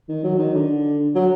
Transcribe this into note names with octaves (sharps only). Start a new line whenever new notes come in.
D#3
F#3
D#3
D3
F#3